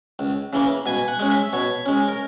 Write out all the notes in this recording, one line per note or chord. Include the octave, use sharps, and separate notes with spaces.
C#2
C#3 E3 A#3
B2 G#5
F#5
G#3 C#4
E5
B2 C#5
G#3 C#4
A#4